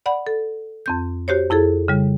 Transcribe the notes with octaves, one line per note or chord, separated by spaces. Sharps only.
D5 F#5 B5
A4
F2 C4 G6
F#4 G4 C5 C#5
F2 E4 G#4 A4
C#3 G3